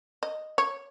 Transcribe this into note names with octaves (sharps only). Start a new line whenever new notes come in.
D#5
C#5